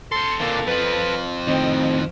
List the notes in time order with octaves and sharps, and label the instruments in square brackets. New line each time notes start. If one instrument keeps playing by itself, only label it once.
[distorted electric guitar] A4 C5 [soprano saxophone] C6 [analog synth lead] C#7
[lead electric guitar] A#2 D3 [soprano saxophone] A#3 [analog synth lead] A6
[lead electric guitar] F2 F3 [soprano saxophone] B4
[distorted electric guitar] A2 D#3 [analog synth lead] C4 [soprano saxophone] D#5